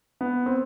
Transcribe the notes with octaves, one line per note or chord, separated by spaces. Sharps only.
B3
C4